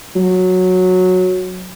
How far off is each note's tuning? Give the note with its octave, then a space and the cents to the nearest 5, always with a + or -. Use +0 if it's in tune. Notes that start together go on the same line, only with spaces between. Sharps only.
F#3 -10